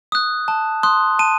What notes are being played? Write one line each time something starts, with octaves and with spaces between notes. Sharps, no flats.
D#6 F#6
A5
C6 D#6 F#6
A5 D#7